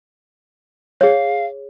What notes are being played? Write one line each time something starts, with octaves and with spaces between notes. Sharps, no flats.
G#4 C#5 F5